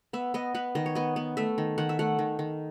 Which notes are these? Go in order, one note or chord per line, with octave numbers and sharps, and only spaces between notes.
B3 E5
B3 D#5
B3 B4
D#3 D#5
C#5
B3 D#5
B3
A3 E5
D#3
D#3 F#5
E5
A3 F#5
D#3
D#3